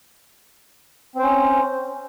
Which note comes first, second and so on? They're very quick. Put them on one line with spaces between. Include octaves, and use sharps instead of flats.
C4 C5 C#4